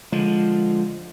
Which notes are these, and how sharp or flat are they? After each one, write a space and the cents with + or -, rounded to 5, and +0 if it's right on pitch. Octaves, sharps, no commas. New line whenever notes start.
D3 +0 F3 +0 G#3 +0